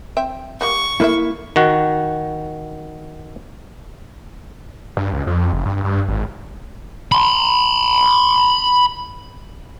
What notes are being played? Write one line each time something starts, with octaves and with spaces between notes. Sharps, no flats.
C4 E5 G5
G3 A#3 F#4 C#6
A#3 E4 A4 B4 E5
D#3 F#4
G2
C#2
F2
F#1
G2
G2
G#1
B5 C6